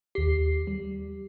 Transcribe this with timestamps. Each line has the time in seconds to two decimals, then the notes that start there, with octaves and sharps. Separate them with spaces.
0.15 D#2 G4 C7
0.67 G3